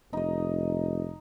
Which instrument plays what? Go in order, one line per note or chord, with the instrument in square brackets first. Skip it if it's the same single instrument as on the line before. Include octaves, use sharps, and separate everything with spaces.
[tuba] F1 [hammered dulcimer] D#4 D#5